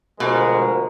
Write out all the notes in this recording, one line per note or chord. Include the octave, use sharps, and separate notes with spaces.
D2 B2 F3 G#3 A#4